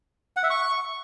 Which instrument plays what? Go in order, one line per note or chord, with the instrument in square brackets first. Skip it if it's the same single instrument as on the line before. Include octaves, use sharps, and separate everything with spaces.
[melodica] F#5
E5
C#6